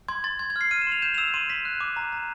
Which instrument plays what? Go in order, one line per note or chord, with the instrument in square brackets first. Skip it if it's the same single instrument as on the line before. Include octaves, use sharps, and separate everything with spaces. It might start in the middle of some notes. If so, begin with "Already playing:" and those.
[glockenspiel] C6 G#6
C6 A6
C6 G#6
G#6
F6 C7
F6 D#7
E7
C6 F7
G6 E7
F7
E6 E7
C6 D#7
C6 B6
F#6
D6
A#5
A#5